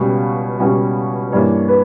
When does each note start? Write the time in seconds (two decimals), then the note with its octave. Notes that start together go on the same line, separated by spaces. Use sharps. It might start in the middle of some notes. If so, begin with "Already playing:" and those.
Already playing: C#2 B2 G3 C#4
0.59 C#2 B2 G3 C#4
1.32 G2 E3 A#3 C#5
1.69 B4